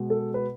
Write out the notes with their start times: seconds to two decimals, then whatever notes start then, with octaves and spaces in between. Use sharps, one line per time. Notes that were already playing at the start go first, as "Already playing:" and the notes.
Already playing: B2 G#3
0.10 A4
0.34 B4